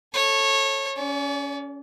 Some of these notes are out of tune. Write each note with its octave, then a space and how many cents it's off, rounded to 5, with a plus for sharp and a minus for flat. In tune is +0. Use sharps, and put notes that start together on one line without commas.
A4 +0 C#5 -20
C#4 +20 D5 -35